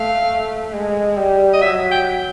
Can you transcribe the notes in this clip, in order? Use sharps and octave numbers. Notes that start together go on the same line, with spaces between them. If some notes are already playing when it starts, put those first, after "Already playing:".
Already playing: A3 F5
G#3
G3
D#5
F#3 E5
G5